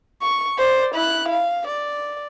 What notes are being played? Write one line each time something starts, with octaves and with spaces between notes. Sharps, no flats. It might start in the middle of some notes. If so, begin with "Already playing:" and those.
C#6
C5 D5
E4 F#6
F5
D5